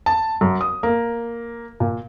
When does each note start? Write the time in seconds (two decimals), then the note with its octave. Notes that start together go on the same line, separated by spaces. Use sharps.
0.06 A5
0.41 F#2
0.61 D#6
0.83 A#3
1.80 A#2